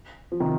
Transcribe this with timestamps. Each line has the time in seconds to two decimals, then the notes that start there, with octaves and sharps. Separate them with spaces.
0.32 F3
0.40 C3 D#3